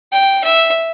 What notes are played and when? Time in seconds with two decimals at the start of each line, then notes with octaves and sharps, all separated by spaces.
0.12 G5
0.44 E5